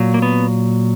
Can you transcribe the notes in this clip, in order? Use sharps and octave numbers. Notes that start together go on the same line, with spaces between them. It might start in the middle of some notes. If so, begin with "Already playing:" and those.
Already playing: A#2 F#3
A#3
B3